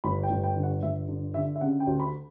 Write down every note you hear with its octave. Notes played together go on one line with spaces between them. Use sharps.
G1 B5
G5
G1
G5
D3
F#5
G1 E5
D3
D3 E5
E5
C#3 F#5
G5
D2
B5